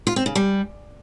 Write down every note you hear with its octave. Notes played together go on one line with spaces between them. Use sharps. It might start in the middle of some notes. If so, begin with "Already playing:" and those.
F4
C4
C#3
G3